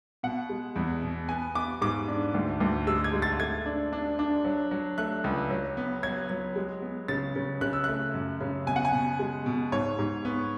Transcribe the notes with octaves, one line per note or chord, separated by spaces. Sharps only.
B2 F#5
G#3
E2
B2
B3 G#5
B3 D6
G#2 D6
D4
D2
D2
G#3 E6
G#6
G#3
A6
A3 G#6
D4
D4
D4
F#3
F#3
A3 F#6
C#2
F#3
B3
F#3 G#6
F#3
G#3
B3
C#3 A6
C#3
C#3 F#6
E6
A3 F#6
F#2
C#3
B2 G#5
F#5
G#5
B2
G#3
B2
G#2 C#5
G#2
B3